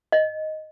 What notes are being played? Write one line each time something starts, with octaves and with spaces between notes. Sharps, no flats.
D#5